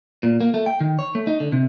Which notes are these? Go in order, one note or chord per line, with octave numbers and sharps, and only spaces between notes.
A#2
A#3
A3
G5
D#3
C#5
A3
D#4
D3
C3